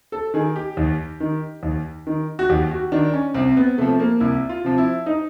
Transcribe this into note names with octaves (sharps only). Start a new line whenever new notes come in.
A4
D#3 G#4
G4
D#2
D#3
D#2
D#3
F#4
D#2 G4
F#4
D#3 D4
C#4
C2 C4
B3
C3 F3 A3
A#3
C2 E4
F4
C3 F3
E4
D#4